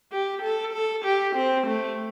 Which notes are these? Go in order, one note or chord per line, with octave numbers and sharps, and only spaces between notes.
G4
A4
A4
G4
C4
A3